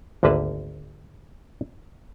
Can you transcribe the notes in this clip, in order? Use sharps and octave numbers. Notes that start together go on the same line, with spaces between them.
G#1 D2 D3 A#3 B4 A5